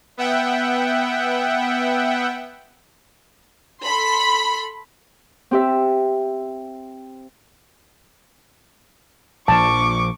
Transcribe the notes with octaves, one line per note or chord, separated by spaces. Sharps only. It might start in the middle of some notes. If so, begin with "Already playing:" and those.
B3 E5 F#5 G5
A4 B5 C6
C4 G4 E5
A#1 F3 A5 C#6 D6